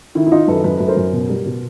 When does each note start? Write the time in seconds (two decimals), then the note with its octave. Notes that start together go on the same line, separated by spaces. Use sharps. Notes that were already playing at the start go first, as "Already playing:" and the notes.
0.15 D#3 E4
0.27 E4
0.32 D#3 D#4 F4
0.48 F#2 A4 B4
0.64 F#2 A4 B4
0.77 F#2 B4
0.88 A#4 C5
0.97 F#2
1.13 B2
1.29 G3
1.46 B2